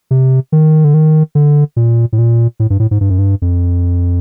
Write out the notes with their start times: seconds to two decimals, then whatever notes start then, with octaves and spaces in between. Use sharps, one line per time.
0.11 C3
0.52 D#3
0.84 D3
0.94 D#3
1.35 D3
1.76 A#2
2.13 A2
2.18 A#2
2.60 A2
2.70 G2
2.80 A2
2.91 G#2
3.01 G2
3.10 F#2
3.18 G2
3.42 F2